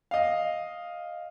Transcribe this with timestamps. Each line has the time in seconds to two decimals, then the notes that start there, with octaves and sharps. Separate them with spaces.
0.11 D#5 F5